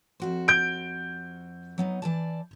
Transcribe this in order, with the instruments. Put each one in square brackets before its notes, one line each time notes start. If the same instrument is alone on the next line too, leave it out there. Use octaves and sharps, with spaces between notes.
[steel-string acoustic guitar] F2 F#4 C5
[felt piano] G6 D7
[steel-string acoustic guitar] F#3 B3 D#4
E3 D5 A5